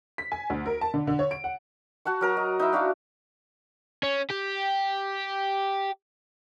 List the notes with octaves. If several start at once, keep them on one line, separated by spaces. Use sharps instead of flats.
B6
G#5
D2
A#4
A5
D3
D3
C#5
D7
F#5
F#4 F#5 A5 C#6
F#3 A#4 A#5
D#5
D#4 E4 E5
D4 F#4 E5 F5
C#4
G4